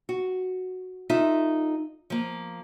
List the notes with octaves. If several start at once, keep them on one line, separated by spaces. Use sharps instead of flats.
F#4
D#4 F4 A4 E5
F3 A#3